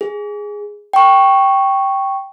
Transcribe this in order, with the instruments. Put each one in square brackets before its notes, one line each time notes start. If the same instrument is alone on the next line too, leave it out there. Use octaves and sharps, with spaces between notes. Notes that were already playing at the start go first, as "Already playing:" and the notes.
[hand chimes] G#4
G5 C#6